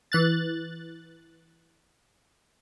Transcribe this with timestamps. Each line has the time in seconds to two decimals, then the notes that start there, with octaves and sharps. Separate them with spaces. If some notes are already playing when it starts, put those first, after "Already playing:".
0.12 E3 F#6 A6